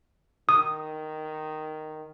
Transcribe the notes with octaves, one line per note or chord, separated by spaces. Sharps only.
D#3 D#6